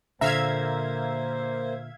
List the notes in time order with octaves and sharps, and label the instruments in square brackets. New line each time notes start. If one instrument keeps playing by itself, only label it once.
[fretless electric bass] A#2 D3 [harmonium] A#3 C5 [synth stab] E5 F5 G#6 [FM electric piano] A#5